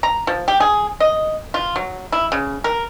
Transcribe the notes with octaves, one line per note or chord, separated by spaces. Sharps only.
A#5
F3
G4
G#4
D#5
F4
F#3
E4
C#3
A#4